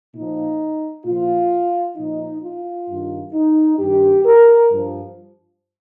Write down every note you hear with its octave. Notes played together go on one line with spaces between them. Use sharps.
A#2 F3 D#4
A#2 F3 F4
A#2 F3 D#4
F4
G2 D#3
D#4
G2 D#3 G4
A#4
G2 F3